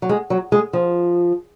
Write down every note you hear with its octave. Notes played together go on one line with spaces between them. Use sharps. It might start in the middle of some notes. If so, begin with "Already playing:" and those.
F#3
G#3
F#3
G#3
F3